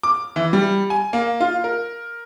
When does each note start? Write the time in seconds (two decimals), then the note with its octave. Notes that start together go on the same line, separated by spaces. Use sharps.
0.03 D6
0.36 E3
0.53 G3
0.90 G#5
1.13 A#3
1.40 F4
1.64 A#4